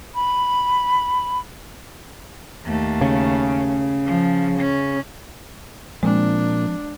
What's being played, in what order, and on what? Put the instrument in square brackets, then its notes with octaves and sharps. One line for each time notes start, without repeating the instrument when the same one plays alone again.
[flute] B5
[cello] D#2 A3
[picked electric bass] C#3
[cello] F3
C#4
[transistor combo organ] A#2 [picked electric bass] F3 C4 [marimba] G#3 [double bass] D4